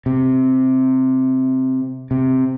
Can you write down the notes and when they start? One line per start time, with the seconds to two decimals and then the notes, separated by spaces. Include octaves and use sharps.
0.06 C3
2.11 C3